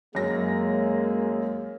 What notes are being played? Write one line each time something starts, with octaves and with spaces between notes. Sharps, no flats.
F#2 G#3 A#3 A#6